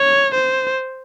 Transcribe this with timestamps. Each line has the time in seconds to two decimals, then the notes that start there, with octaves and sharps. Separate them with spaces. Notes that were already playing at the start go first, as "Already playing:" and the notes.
Already playing: C#5
0.34 C5